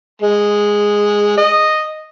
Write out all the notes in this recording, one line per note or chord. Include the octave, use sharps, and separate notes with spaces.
G#3
D#5